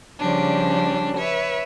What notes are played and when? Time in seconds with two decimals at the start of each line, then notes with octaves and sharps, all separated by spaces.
0.19 C#3 F3 G3 C#4 D4
1.17 B4 C#5 E5